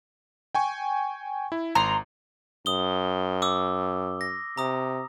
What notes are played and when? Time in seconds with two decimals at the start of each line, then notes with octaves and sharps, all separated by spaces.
0.55 G5 G#5 C#6
1.52 E4
1.75 G#1 A#5 C6
2.66 F#2 D#6 G7
3.42 D6 E6
4.21 A#6
4.57 C3 A#5 D#6